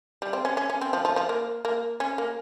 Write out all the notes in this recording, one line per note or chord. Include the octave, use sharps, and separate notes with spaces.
G3
C4
C#4
C#4
C#4
C4
F3
F3
F3
A#3
A#3
C#4
A#3